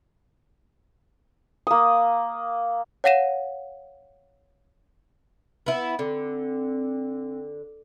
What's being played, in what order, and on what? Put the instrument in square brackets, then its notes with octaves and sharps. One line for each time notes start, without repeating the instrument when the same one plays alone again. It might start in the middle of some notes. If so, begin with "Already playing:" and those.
[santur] A#3 D#6
[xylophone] C#5 F5 F#5 A#6 D#7 E7
[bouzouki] B3 E4
[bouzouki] D3 [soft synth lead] C4